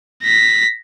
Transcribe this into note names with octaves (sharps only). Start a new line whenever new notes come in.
A#6 B6